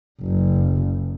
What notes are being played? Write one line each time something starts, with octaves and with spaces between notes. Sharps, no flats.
F#1